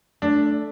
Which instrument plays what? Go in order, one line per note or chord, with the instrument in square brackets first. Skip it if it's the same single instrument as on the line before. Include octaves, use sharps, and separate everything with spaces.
[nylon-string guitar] A3 [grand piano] D4